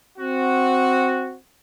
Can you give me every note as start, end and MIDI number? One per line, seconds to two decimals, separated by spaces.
0.18 1.36 60
0.18 1.36 66